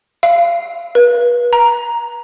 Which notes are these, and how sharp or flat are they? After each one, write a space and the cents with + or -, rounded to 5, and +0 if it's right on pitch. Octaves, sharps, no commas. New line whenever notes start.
F5 -30
B4 -35
A#5 +10